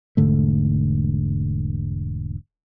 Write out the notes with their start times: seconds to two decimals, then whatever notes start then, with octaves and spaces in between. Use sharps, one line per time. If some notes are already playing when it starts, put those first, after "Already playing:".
0.17 E1 G#2 D3 A3